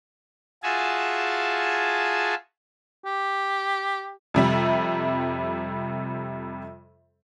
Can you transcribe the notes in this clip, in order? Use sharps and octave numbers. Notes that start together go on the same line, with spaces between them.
F4 F#4 G#4 E5 G#5 A5
G4
F2 C3 G3